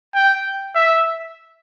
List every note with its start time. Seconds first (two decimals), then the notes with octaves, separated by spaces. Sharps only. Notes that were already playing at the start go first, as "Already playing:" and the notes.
0.14 G5
0.75 E5